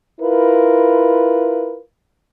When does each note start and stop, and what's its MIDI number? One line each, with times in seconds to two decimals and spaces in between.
0.20 1.79 64
0.20 1.79 65
0.20 1.79 70
0.20 1.79 71